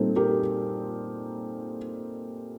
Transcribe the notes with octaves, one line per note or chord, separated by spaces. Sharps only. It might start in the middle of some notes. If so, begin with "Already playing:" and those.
Already playing: A#2 G3 C4 D#4 A4
G4 A#4